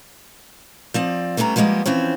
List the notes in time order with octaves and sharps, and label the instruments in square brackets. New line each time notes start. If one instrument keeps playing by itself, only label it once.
[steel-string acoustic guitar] F3 C4 D5
G3 A3 B3 C#4 A#5
F3 G3 G#3 A#3 B3
E3 F3 C4 C#4